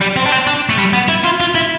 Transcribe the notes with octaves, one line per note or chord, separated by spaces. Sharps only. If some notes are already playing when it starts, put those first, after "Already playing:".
G3
C4
D4
C4
D4
A3
G3
B3
E4
F4
F4
E4